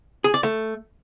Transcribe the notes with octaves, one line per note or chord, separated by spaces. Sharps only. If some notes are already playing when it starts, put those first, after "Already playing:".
G#4
D5
A3